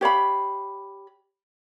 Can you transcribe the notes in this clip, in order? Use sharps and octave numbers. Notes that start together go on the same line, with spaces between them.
G4 C#5 F5 B5